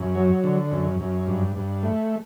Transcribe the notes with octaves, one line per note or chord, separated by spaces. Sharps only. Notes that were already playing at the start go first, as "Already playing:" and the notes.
Already playing: F#2
F#3
D3
F#2
F#2
G2
G2
A3